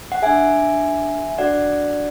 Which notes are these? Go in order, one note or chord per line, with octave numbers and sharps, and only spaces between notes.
F#5
D4 G#4 E5 G#5
D4 F#4 A4 D5 F#5